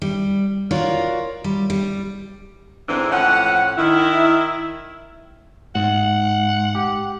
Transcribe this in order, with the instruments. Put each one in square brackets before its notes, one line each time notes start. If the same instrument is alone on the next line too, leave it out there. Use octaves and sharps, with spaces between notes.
[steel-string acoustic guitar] G3
F4 F#4 A#4 C#5 D5 F5
G3
G3
[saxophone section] G#2 D3 E3 C4 D4 E4
A2 F3 C#4 F#5
D#3 E4
[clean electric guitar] G#2 [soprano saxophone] F#5
[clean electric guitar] G4